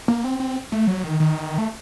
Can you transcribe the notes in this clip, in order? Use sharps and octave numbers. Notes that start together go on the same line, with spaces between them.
A#3
C4
C4
A3
F#3
D#3
D#3
A3